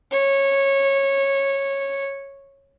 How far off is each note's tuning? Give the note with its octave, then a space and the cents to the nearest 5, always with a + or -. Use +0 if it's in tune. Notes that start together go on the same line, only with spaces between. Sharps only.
C#5 -15